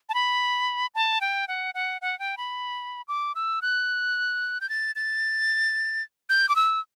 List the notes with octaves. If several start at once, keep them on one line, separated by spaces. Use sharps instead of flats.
A5
B5
A5
G5
F#5
F#5
F#5
G5
B5
D6
E6
F#6
G6
A6
A6
G6
D6
E6